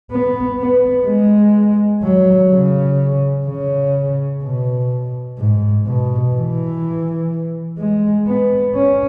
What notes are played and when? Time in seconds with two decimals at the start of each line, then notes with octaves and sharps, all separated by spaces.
0.11 B3
0.59 B3
1.07 G#3
2.03 F#3
2.51 C#3
3.47 C#3
4.43 B2
5.39 G#2
5.86 B2
6.35 E3
7.78 G#3
8.26 B3
8.75 C#4